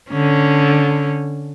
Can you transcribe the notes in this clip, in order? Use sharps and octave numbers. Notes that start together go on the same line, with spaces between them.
D3 C#4